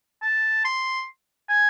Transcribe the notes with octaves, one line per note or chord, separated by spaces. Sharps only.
A5
C6
G#5